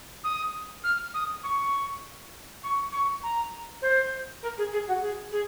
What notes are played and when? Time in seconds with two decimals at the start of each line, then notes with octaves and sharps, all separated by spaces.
0.23 D#6
0.83 F6
1.14 D#6
1.43 C#6
2.63 C#6
2.92 C#6
3.23 A#5
3.81 C5
4.42 A#4
4.57 G#4
4.72 G#4
4.87 F#4
5.01 G#4
5.31 G#4